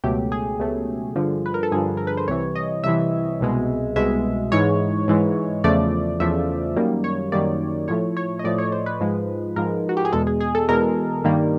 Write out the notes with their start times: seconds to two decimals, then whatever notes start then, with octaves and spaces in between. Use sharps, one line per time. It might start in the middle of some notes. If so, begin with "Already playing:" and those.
0.04 C#2 B2 F#3 A3 G4
0.32 G#4
0.59 C#2 B2 F#3 A3
1.16 G2 D3 F3
1.46 B4
1.54 A#4
1.63 A4
1.72 G2 D3 F3 G#4
1.97 A#4
2.07 B4
2.17 C5
2.28 C2 C3 E3 C#5
2.55 D#5
2.84 C2 C3 E3 E5
3.40 C2 B2 G#3
3.96 C2 B2 G#3 E5
4.52 G#2 E3 G#3 C#5
5.08 G#2 E3 G#3
5.64 E2 C#3 F3 A3 D5
6.20 E2 C#3 F3 A3 E5
6.76 F#2 D#3 G3 A#3
7.04 C#5
7.32 F#2 D#3 G3 A#3 D5
7.88 A2 F3 A3 C#5
8.17 C#5
8.39 D#5
8.44 A2 F3 A3 D5
8.58 C#5
8.72 C5
8.86 B4
9.01 G#2 F3 G#3
9.56 G#2 F3 G#3 A#4
9.89 F#4
9.97 G4
10.05 G#4
10.13 E2 B2 G#3 A4
10.27 G#4
10.41 G#4
10.55 A4
10.68 E2 B2 G#3 A#4
11.24 G2 D#3 G3 A#3